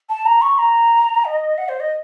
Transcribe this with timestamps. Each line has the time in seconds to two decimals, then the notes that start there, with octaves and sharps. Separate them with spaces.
0.09 A5
0.26 A#5
0.42 C#6
0.58 A#5
1.25 D#5
1.58 F#5
1.68 C5
1.80 D#5